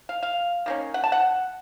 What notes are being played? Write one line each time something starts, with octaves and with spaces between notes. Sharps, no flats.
F5
F5
D#3 A#3 C#4
F#5
A5
F#5